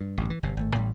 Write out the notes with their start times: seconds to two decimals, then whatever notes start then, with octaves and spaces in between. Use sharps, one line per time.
0.01 G2
0.18 A1 G2 D3
0.30 E3
0.43 G1 C3
0.57 G#1 A2 A3
0.74 A1 A2 E3 G3